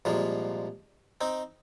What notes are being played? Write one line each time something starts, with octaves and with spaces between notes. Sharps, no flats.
C2 A#2 F3 G#3
C4 D#4